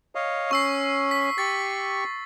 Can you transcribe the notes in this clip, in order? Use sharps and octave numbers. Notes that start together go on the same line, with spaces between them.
C#5 D#5 F5
C#4 C#6 E6 C7
B6
G4 C#6 A6